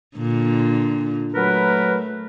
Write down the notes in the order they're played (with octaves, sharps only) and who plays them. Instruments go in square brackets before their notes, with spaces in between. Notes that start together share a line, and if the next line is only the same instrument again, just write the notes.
[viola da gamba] A#2 D3
[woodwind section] F#3 A#4 B4 [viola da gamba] A3